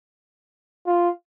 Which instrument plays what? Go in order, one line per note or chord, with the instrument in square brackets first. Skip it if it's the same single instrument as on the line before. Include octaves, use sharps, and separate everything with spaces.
[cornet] F4